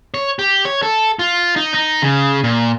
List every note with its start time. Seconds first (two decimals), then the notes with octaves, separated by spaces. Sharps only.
0.14 C#5
0.39 G4
0.65 C#5
0.83 A4
1.19 F4
1.56 D#4
1.74 D#4
2.02 C#3
2.44 A#2